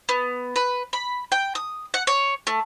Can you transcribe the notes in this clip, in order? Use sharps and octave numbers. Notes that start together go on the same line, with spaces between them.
B3
B4
B5
G5
D#6
F#5
C#5
A3